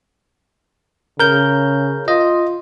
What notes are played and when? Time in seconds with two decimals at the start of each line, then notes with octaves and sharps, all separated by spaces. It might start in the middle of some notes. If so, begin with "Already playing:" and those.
1.20 C#3 A#4 G6
2.08 F4 D#5